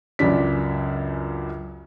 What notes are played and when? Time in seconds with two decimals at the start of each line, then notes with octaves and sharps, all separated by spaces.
0.19 C#2 F#2 C#3 D4 B6